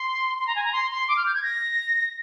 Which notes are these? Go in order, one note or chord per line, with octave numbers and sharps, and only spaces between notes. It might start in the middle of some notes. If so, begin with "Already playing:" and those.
Already playing: C6
C6
A#5
G#5
A#5
C6
C6
D6
F6
G6
G#6
A#6